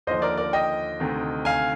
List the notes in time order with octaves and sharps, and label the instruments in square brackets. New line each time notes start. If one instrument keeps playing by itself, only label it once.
[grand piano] D#2 D3 F3 C5 D#5
A#4 D5
A#4 D5
D#5 G5
D2 C3 D#3
F5 G#5